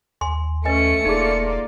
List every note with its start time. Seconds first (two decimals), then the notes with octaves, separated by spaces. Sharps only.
0.21 D#2 G#5 C6
0.65 A3 C#4 B4 D#5 G#5 C#7
1.05 E1 A#3 D#4 F4 G#4 D5